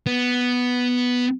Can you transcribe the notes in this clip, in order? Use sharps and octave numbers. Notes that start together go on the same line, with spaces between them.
B3